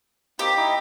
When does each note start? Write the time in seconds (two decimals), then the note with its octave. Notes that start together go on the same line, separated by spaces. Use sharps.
0.39 A#3 C4 D#4 G4
0.56 D#4 E4 D#5